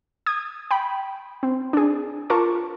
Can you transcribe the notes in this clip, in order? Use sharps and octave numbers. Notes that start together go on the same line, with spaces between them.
D#6 G#6
G5 B5
C4
D4 G#4
F4 A#4 A5 A#5 C#6 D6